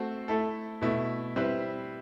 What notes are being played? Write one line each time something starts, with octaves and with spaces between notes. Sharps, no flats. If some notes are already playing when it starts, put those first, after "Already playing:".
Already playing: A3 C4 F#4 A4
A3 E4 A4
B2 A3 E4
G3 C4 E4 B4